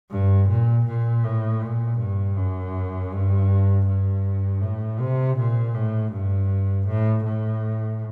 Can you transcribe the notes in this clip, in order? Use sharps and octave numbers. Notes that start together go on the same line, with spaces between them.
G2
A#2
A#2
A2
A#2
G2
F#2
G2
G2
A2
C3
A#2
A2
G2
A2
A2